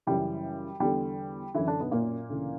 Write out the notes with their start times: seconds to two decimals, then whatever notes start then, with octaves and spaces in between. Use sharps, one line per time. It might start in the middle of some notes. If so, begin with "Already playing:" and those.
0.07 F#2 C#3 E3 G3
0.80 E2 D3 G3
1.54 F#2 D3 E3 E4
1.68 D3 D4
1.80 B2 B3
1.91 A#2 A#3
2.29 D2 C#3 E3